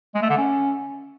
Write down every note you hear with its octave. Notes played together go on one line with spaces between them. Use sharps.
G#3
A3
D3
C#4